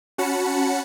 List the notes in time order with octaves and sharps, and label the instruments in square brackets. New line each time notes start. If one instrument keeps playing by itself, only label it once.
[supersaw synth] C#4 F#4 F#5 A5 B5 C#7